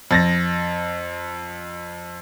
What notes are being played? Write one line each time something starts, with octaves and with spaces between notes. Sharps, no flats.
F2 A6 A#6